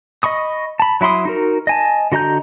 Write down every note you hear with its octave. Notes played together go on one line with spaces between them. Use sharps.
D#5 B5 C#6 D#6
A5 B5
F#3 E4 B5 C6 D#6
D#4 F#4 A#4
D#5 G#5 A5
D3 F#4 D#5 A#5 G6